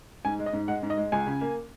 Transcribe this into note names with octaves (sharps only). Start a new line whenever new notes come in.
G#2 G#5
G#3
D#5
G#2
G#3 F#5
G#2
D#5
G#3
C#2 G#5
C#3
A#3